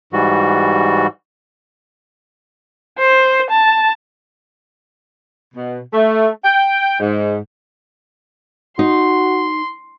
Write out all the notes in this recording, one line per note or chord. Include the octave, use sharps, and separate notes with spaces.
G#2 E3 G3 F#4
C5
A5
B2
A3
G5
G#2
D#4 F#4 C6